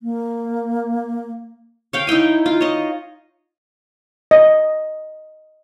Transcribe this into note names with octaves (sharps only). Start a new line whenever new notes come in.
A#3
C#5 F5 G5
D#4 E4 G5 G#5
F4
C#5 D#5
D#5